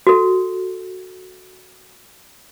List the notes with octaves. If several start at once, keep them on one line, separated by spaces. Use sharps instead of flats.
F#4 A4